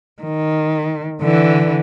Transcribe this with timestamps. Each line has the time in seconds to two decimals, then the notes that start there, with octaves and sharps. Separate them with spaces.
0.22 D#3
1.21 D3 E3